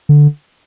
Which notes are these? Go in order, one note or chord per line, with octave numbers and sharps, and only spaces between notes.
D3